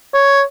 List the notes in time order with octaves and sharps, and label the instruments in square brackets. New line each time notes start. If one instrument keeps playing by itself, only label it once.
[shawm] C#5